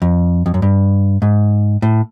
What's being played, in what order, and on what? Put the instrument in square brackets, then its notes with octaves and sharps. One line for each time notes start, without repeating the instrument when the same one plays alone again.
[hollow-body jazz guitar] F2
F2
F#2
G2
G#2
A2